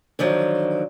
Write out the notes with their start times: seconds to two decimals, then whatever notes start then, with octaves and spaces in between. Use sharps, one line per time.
0.19 D3 D#3 F3 F#3